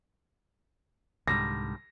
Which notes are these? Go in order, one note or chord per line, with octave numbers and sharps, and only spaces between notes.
C2 G#2 D3 D#3 G3 A#6